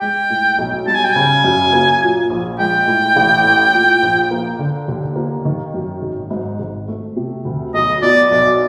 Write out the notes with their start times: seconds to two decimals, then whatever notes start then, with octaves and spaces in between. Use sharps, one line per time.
0.01 G#3 G5
0.30 A2
0.58 B1
0.87 G3 A5
0.95 G#5
1.05 G5
1.13 C#3 G#5
1.44 F#2
1.73 A#3
2.02 A#2
2.30 A#1
2.59 G#3 G5
2.87 A2
3.16 A1
3.44 A3
3.73 A#2
4.02 A#1
4.31 A#3
4.59 D3
4.88 D#2
5.16 A#3
5.45 D#3
5.74 F#2
6.02 G#1
6.30 G#2
6.59 G#1
6.88 A3
7.16 C3
7.45 D2
7.74 B1 D#5
8.02 B2 D5
8.31 B1 D5